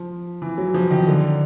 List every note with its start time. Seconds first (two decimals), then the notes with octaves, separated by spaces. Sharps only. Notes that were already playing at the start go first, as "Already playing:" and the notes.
Already playing: F3
0.42 E3
0.58 F#3
0.74 F3
0.91 D#3
1.07 D3